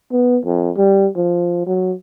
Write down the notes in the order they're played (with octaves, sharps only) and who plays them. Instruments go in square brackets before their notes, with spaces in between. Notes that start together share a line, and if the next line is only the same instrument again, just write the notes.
[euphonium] B3
F2
G3
F3
F#3